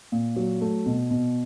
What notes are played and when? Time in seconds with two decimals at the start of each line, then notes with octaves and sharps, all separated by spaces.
0.12 A#2
0.36 F#3
0.61 A3
0.86 B2
1.11 B2